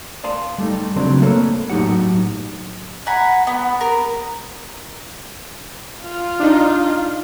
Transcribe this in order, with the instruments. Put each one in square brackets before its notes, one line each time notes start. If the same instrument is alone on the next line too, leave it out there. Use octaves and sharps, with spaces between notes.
[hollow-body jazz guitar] D5 F5 A5 C6
G3 A3 D#4
C#3 F#3 C4 D4
A3 A#3 A4 B4 C#5
A2 F#3 D#4 G4 F#5
[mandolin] F#5 G#5 A#5 B5
B3
A#4
[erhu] F4
[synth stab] D4 D#4